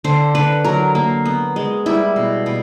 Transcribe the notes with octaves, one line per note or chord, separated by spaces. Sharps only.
D3 C5
D3 B4
F#3 A#4
A#3
B3
G#3
G3 E4
B2
B2